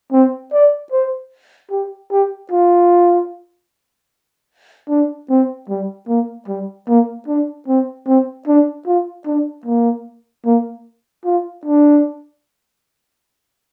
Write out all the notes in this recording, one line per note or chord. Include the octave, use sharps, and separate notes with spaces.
C4
D5
C5
G4
G4
F4
D4
C4
G3
A#3
G3
A#3
D4
C4
C4
D4
F4
D4
A#3
A#3
F4
D4